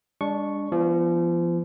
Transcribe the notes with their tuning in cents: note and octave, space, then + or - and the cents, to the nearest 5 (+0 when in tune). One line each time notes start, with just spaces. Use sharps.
G#3 -45 D4 -15 C#6 +0
F3 -35 B3 +0